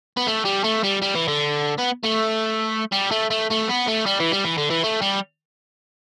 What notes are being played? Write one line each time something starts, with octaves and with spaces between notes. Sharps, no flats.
B3
A3
G3
A3
G3
G3
E3
D3
B3
A3
G3
A3
A3
A3
B3
A3
G3
E3
G3
E3
D3
E3
A3
G3